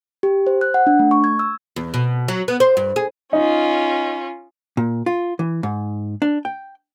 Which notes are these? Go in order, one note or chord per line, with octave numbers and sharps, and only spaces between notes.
G4
C5
F#6
F#5
D4
A3
C#6
G#6
E6
E2
B2
F#3
B3
C5
G2
G#4
C#4 D#4 F4
A#2
F4
E3
G#2
D4
G5